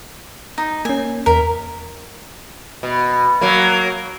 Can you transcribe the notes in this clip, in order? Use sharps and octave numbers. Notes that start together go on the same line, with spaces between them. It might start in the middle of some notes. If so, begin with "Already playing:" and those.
D#4
A#3 C#4 G#5
E2 A#4 B6
B2
F#3 A#3